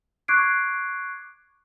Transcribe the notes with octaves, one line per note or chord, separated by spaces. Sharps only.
C#6 D6 F#6 G#6 C7 D7